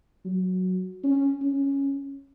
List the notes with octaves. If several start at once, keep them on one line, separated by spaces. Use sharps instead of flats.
F#3
C#4
C#4